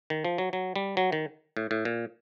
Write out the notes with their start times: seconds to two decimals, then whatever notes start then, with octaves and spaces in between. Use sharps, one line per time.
0.10 D#3
0.25 F3
0.38 F#3
0.53 F#3
0.76 G3
0.97 F#3
1.12 D#3
1.57 A2
1.71 A2
1.85 A#2